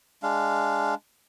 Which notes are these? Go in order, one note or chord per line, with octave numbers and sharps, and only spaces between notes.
G#3 D4 F5